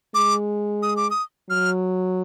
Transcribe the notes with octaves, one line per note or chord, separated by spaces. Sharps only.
G#3 D6
D#6
D6
D#6
F#3 F6